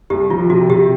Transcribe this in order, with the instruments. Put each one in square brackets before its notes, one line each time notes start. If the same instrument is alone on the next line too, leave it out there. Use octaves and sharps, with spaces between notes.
[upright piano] C2 [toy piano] G4
[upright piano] F3 [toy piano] F4
[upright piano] C3 [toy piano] F#4
[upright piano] C3 [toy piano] G4